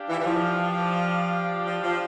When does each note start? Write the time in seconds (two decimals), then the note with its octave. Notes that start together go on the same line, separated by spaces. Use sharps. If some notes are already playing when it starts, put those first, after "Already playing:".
Already playing: D4 G4 D5 F5
0.09 E3
0.19 E3
0.26 F3
1.65 F3
1.83 F3